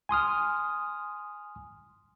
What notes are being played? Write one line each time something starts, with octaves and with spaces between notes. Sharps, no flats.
G#5 C6 D#6 F6